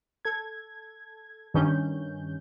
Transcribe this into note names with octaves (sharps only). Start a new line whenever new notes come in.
A4 G#6
G2 D#3 C#4 G6